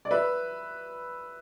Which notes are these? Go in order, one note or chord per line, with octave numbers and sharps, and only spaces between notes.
D5
B4 E5